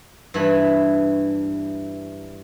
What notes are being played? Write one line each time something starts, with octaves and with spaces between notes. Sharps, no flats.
G2 E3 E4